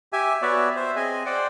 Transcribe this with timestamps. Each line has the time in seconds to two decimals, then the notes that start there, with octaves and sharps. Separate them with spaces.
0.13 G4 E5 G#5
0.42 B3 F#4 C#5 D5 E5
0.76 C5 E5
0.96 C4 G#4 D#5 G#5
1.26 C5 D5 F#5 G5